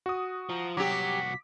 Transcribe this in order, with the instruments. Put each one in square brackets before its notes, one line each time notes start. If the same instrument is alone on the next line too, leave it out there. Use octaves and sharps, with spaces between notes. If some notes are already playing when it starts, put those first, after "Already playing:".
[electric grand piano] F#4 D#6
[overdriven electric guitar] F3 [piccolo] A#5
[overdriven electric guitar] C2 F#4 [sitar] F#3 G4 [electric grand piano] D6 [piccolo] B6